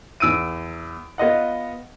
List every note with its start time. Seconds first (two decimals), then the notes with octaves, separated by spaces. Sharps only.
0.20 E2 E6 D7 D#7
1.18 B3 F4 D#5 F#5